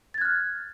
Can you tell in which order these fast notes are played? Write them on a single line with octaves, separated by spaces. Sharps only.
A6 G#6 F#6 F6